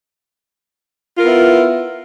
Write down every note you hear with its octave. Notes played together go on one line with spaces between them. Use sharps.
B3 E4 F4 A#4